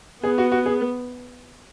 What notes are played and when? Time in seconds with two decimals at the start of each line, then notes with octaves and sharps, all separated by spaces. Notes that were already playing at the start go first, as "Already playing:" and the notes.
0.23 B3 G#4
0.38 F#4
0.52 F#4
0.66 G#4